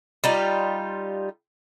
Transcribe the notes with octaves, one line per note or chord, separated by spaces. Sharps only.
G3 D#4 F4